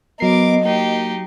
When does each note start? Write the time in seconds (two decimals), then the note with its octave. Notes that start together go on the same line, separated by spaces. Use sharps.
0.20 F#3 B3 A#4 D#5 D6 C7
0.63 A#3 D#4 G4